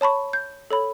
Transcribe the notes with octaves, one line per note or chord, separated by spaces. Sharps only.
C#5 A5 B5 C#6
G6
A4 C#5 B5